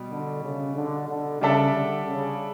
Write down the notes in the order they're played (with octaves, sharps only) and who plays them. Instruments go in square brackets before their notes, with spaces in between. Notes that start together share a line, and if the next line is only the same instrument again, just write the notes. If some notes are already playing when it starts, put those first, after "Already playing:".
Already playing: [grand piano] B2 G3
[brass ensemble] D3
C#3
D3
D3
[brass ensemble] C#3 [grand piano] G3 D4 A4 E5
[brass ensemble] D3
C#3